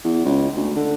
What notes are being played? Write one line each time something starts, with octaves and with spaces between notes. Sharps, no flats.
E2
C#2
D2
D3